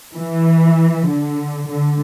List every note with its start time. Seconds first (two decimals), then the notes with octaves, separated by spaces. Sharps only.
0.16 E3
1.08 D3
1.70 D3